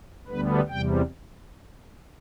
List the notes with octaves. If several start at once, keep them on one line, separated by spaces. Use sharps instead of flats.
D2 D3 G3 B3 B4
E2 C3 G3 G5